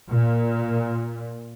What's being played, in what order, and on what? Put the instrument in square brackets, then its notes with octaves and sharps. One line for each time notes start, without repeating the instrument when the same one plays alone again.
[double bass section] A#2